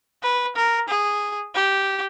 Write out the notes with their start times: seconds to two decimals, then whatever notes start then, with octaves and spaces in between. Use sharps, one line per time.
0.23 B4
0.56 A#4
0.89 G#4
1.55 G4